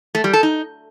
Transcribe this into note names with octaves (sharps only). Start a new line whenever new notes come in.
A3
G3
A4
D#4